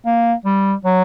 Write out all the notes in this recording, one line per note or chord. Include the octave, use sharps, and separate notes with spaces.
A#3
G3
F#3